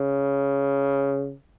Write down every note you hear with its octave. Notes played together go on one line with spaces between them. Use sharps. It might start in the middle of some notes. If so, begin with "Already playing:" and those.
Already playing: C#3